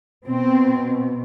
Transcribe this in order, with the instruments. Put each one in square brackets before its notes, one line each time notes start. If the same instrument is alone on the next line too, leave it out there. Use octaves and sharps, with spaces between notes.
[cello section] B2 C4